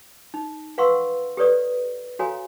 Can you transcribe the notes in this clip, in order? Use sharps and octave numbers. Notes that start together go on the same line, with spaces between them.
D#4
B4 F5 F#5 C6 C#6 E6
G4 A4 B4 C#5 D5 D#6
F#4 A4 C#5 F5 G#5 A#5